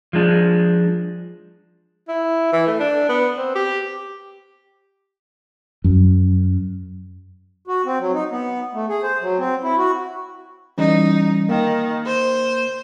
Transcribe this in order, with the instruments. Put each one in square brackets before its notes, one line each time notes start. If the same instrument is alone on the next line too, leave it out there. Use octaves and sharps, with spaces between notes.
[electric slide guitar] F3 G#3 D4
[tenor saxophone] E4
E3
A3
D4
B3
C4
G4
[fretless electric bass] F#2
[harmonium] F#4
C4
F#3
D#4
B3
A3
G#4
C5
F#3
C4
E4
F#4
[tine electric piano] E3 G3 C#4 [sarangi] D#4
[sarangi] D#3 [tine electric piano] A#3
[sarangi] C5